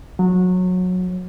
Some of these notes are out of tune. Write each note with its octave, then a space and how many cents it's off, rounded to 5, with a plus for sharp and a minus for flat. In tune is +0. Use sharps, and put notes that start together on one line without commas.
F#3 -20